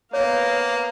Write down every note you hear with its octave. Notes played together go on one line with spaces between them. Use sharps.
A#3 B3 C#5 F5